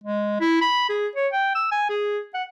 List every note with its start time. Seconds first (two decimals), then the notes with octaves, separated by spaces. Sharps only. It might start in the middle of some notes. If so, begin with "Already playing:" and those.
0.04 G#3
0.40 E4
0.61 B5
0.89 G#4
1.16 C#5
1.33 G5
1.55 E6
1.71 G#5
1.90 G#4
2.34 F#5